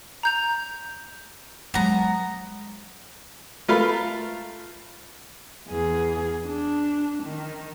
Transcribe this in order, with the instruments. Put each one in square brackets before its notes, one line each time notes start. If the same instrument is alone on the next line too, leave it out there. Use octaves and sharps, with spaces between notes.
[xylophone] A#5 G6 F7
[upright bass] F#3 G#3 [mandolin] B3 A#5
[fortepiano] A3 F4 A#4 B4
[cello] E2 G#4
D4
D#3